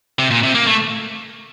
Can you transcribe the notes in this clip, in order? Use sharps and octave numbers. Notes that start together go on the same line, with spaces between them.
C3
A#2
C3
A#3
A3